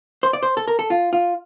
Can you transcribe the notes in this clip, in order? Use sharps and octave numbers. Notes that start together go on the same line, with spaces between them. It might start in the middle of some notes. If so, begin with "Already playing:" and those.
C5
D5
C5
A4
A#4
A4
F4
F4